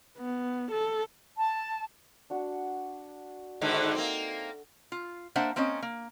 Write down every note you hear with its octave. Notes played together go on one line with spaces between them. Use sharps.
B3
A4
A5
D4 F#4 A5
G#2 D3 D#3 A4 E5
A#3 C4
F4
A#3 D4 C5 E5 F#5
A#3 C4 C#4 C#5 D#5
A#3